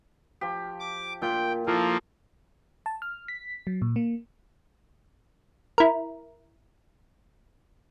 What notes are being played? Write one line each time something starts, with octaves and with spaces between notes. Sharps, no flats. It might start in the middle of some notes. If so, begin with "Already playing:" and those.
F3 G4
D6
A#2 F4 G5
F3 A#3 E4 F4 A4
A5
F6
B6
F#3
A#2
A#3
E4 A#4